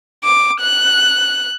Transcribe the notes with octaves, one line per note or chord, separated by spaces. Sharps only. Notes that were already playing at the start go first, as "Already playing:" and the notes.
D6
F#6